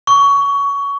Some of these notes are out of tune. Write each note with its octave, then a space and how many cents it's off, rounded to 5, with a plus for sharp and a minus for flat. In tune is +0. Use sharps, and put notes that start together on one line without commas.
C#6 +20